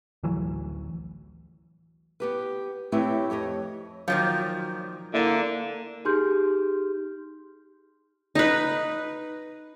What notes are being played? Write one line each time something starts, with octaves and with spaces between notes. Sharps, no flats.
D1 A1 E3 F#3
B3 G4 B4
A3 C4 E4 G4 B4 C#5
F2 G4 C#5 D#5
A#2 D#3 F3 F#3
D3 A#3 E4
D#4 G4 G#4 C6 F6 G6
D#4 B4